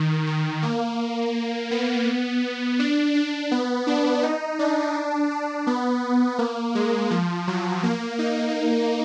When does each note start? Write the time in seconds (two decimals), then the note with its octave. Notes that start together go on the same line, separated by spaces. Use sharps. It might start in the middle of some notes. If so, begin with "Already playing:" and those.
Already playing: D#3
0.27 D#3
0.62 A#3
1.71 B3
2.79 D4
3.15 D4
3.51 B3
3.87 D4
4.23 D#4
4.59 D4
5.31 D4
5.67 B3
6.38 A#3
6.75 G#3
7.10 F3
7.47 F#3
7.83 A#3
8.19 D#4